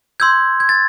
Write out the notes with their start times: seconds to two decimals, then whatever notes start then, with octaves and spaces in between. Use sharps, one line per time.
0.20 C6 E6 G6 G#6
0.60 G#6
0.69 A6